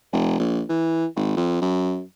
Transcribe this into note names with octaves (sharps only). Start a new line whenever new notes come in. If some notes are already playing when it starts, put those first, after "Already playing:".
F1
A#1
E3
G#1
F2
F#2